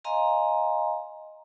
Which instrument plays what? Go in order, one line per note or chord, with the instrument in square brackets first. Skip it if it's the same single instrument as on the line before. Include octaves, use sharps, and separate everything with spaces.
[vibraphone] D#5 F5 G#5 A#5 C6